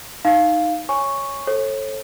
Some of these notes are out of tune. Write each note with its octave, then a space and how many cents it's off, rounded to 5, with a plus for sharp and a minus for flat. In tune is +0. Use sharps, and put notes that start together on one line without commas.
D#4 +0 F5 +0
C#5 +0 G#5 +0 C#6 +0
A4 +0 C#5 -40